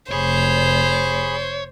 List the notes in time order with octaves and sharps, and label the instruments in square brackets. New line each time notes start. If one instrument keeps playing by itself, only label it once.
[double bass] F1 [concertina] G#4 B5 [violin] C5 [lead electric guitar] C#5